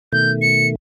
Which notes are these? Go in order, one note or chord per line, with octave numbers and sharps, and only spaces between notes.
B2 D#3 A3 G6
C#7